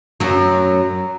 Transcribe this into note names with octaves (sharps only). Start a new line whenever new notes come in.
F#2 F#3